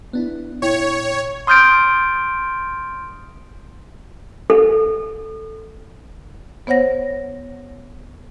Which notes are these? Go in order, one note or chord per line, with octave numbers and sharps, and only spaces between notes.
B3 D4 E4
A#2 E4 C#5 G5
C6 D#6 F6 G6 A6 D7
A4
B3 C5 C#5 F#5 A#6